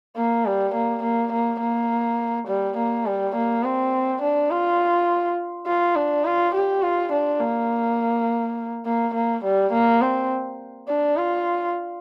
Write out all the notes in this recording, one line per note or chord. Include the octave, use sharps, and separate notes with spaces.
A#3
G3
A#3
A#3
A#3
A#3
G3
A#3
G3
A#3
C4
D4
F4
F4
D4
F4
G4
F4
D4
A#3
A#3
A#3
G3
A#3
C4
D4
F4